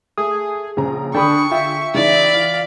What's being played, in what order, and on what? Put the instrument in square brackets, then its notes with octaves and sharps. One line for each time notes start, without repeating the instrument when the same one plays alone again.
[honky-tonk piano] A3 [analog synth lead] G#4 [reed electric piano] D#6
[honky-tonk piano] A#1 C5 A#5 [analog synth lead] C#3 [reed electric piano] G#4
[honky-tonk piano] D3 G#4 A4 [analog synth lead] D4 [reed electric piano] G5 B5 D#6 [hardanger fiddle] C#6
[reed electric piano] F4 G5 [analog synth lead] E5
[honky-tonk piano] C#3 E3 D#4 [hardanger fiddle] D5 B5
[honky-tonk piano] E3 [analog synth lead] F5